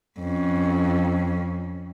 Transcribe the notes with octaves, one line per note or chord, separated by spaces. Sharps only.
F2 C#4